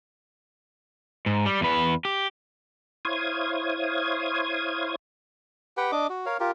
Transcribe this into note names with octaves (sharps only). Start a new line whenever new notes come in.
G#2
G3
E2 B4
G4
E4 C5 C#5 F5 D#6 G#6
G4 B4 F#5 G5
D4 D#5 D6
F#4
A#4 C#5 F5
F4 G4 A#4